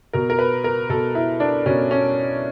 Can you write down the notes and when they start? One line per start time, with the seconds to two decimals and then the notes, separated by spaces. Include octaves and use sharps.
0.13 B2 A#4
0.30 A#4
0.39 B4
0.64 A#4
0.89 B2 A4
1.15 E4
1.40 D4
1.66 B2 C#4
1.91 C#4